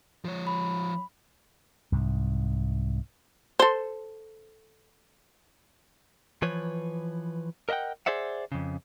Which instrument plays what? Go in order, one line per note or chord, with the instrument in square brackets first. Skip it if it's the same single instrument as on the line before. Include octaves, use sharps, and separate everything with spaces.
[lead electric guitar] F3 C#5
[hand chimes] B5
[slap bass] C2 G#2
[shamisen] A4 C5
[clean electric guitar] E3 F3 B4 C#5
A#4 D#5 E5 F#5 G5
G#4 C5 D5 E5 F#5
F2 C#3